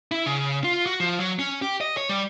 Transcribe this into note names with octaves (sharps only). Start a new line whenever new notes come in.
E4
C#3
F4
F#4
F3
F#3
C#4
G4
D#5
C#5
G3